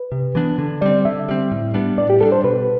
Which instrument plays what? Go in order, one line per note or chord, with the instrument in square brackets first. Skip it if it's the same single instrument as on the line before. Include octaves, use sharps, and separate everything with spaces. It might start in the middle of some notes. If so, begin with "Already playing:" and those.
Already playing: [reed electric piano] B4
[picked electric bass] C3
E3 B3 D4
D3
[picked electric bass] G3 C4 [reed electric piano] D5
[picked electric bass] D3 [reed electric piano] E5
[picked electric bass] G3 C4
A2
G3 B3 D4
[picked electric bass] A2 [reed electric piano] D5
[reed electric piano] G4
[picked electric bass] G3 B3 [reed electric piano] A4
[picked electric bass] D4
[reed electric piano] C5
[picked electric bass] B2 [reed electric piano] B4